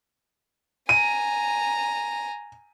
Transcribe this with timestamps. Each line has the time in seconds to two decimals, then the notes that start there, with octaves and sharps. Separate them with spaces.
0.89 G#5 A#5 D#7